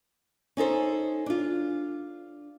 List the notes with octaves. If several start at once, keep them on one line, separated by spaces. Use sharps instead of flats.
C#4 D#4 A4 C5
D4 F4